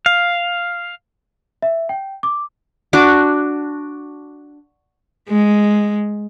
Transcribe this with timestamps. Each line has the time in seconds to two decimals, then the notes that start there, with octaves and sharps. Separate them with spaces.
0.06 F5
1.62 E5
1.89 G5
2.23 D6
2.93 D4 F#4 D6
5.29 G#3